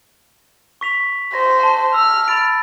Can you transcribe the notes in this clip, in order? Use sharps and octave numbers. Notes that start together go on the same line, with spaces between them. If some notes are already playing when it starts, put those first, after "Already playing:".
C#6 B6 F7
C5 A#6
A5
E6 F6
B5 A6 D7